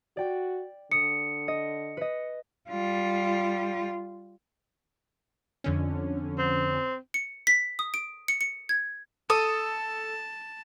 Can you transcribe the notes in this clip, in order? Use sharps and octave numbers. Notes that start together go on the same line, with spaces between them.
F#4 D5 G5
D3 D#6 C#7
D#5
B4 D#5
G3 F4
F2 D3 C#4
C4
C#7
B6
D#6
D7
C#7
C#7
G#6
A4 A5 D#6